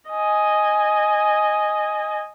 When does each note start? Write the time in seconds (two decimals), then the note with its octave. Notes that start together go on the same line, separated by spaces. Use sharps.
0.10 D#5 G#5